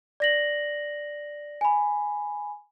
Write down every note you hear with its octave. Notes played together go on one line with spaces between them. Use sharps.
D5 A#6 F#7
G#5 B5